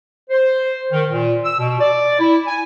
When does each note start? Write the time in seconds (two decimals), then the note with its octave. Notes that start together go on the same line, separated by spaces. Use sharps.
0.30 C5
0.92 D#3
1.09 A#2
1.44 E6
1.58 B2
1.80 D5
2.19 E4
2.47 G#5